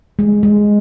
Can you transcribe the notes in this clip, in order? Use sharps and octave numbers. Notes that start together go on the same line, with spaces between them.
G#3
G#3